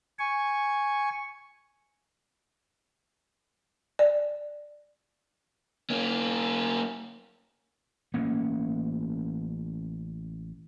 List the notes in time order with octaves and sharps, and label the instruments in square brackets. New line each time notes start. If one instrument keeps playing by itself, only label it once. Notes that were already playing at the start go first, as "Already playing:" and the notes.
[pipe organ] G#5 C#6
[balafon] D5
[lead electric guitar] A#3 C#4
[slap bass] A1 A#3 C#4